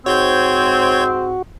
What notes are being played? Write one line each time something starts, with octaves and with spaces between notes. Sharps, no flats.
G#2 C4 F#4 C#5 G6 G#6